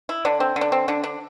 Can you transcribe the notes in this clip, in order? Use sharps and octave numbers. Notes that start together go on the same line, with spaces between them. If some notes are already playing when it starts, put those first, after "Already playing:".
E4
D3 D4
C4
D3
D4
C4
D3 D4
D4